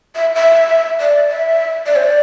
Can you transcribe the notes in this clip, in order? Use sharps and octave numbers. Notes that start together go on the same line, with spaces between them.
E5
E5
D5
E5
D5
C5
D5